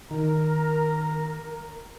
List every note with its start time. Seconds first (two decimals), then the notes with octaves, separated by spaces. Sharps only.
0.11 D#3 A#4 A#5